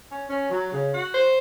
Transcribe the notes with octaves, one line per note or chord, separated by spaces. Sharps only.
C#4
C#4
F#3
C#3
F#4
C5